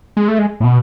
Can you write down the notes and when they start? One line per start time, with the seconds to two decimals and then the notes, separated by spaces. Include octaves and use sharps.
0.17 G#3
0.28 A3
0.39 G#3
0.60 A2
0.64 B2